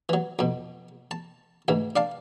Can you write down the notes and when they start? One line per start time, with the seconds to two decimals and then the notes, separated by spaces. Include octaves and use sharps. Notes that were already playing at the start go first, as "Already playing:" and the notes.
0.09 E3 F#3
0.39 F2 B2
1.11 A5
1.68 D2 G#2 E3
1.96 D4 F5 A5